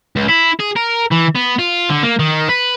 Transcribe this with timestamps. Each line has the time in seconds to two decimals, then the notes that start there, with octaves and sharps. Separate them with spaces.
0.16 C#2
0.29 E4
0.60 G#4
0.76 A#4
1.12 E3
1.36 B3
1.59 F4
1.89 D3
2.03 A#3
2.20 D#3
2.49 B4